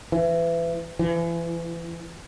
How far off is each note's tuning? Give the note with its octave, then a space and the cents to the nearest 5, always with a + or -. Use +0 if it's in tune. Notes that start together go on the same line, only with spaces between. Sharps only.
E3 +30
E3 +35